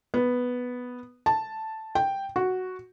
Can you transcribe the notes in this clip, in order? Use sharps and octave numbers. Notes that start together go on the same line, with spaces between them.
B3
A5
G5
F#4